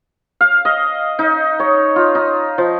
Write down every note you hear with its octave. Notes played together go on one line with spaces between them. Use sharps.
F5
D#5
D#4
C#5
F4
D#4
F3